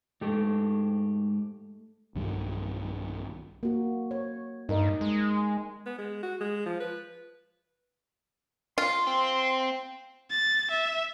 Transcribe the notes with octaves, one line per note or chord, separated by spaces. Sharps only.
G#2 A3 G4
B1 G2 D#3 G3
A#3 F#4
C#5
G2 D#4 A#4 D#5
G#3
B3
G#3
F#4
G#3
F3
B4
F4 C6
C4
A6
E5